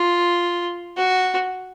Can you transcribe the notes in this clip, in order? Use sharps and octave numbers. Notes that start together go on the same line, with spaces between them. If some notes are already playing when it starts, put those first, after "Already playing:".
Already playing: F4
F#4